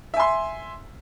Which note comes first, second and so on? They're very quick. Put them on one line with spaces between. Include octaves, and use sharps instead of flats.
E5 G#5 C6